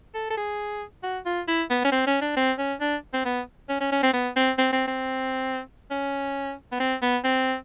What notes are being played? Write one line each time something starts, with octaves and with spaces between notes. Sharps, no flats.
A4
A4
G#4
F#4
F4
E4
B3
C#4
C4
C#4
D4
C4
C#4
D4
C4
B3
C#4
C#4
C#4
C4
B3
C4
C4
C4
C4
C#4
B3
C4
B3
C4